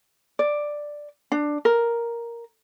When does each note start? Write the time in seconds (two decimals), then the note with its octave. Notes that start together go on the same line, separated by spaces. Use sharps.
0.39 D5
1.32 D4
1.65 A#4